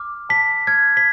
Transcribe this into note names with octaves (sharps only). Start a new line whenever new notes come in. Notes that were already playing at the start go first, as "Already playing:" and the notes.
Already playing: D6 F6
A5 B6
F6 G#6
B6